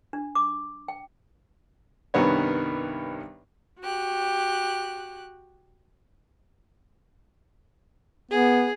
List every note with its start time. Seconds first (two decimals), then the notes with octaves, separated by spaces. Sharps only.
0.13 D4
0.35 D6
0.88 G5
2.14 C2 G2 D#3 B3 C#5
3.81 F#4 G4 F#6
8.31 B3 G#4